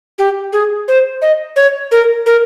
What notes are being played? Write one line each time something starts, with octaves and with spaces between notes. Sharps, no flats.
G4
G#4
C5
D#5
C#5
A#4
A#4